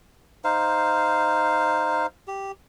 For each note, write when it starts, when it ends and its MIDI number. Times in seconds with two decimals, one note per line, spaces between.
0.44 2.06 63
0.44 2.06 72
0.44 2.06 77
2.28 2.52 67